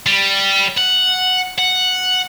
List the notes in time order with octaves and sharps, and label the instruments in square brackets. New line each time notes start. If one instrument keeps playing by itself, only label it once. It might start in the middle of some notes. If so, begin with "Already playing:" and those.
[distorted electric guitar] G3
F#5
F#5